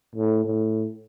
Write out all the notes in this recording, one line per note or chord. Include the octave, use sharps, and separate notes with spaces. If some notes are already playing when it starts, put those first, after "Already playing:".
A2
A2